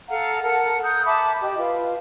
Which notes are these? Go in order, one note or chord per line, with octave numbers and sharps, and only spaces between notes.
A4 F5 F#5 A#5
A4 A#4 F#5 A5
A#5 D#6 F#6 G6
E5 A5 B5 D6
G4 D#5
F4 B4 F5